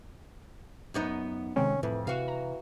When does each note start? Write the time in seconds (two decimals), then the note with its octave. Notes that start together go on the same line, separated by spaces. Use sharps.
0.94 F#2 B3 D#4
1.56 C3 D#3 G#3 C4 C#4
1.83 F2 A2 E3
2.07 C3 E3 F#4 F5
2.28 A#5